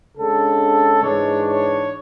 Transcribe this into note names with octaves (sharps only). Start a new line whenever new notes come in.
C#3 G#3 D4 A4
G#2 E3 G#3 D4 C#5
C#5